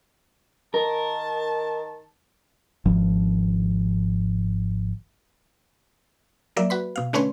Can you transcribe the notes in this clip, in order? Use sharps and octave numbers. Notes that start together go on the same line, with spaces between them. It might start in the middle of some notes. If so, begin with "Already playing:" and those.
D#3 A#4 A5
G#1 D#3 F3
F#3 A#3 D5 E5
F#4 B4 B5
B2 F5
D3 A3 C#4 B4 C#5 C6